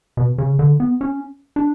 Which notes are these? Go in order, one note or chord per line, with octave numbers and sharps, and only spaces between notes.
B2
C#3
D3
B3
C#4
D4